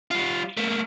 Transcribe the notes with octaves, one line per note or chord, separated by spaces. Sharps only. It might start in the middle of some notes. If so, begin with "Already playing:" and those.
G3 F4
A3 A#3